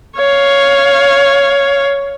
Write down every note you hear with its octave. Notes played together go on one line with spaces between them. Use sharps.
C#5 F5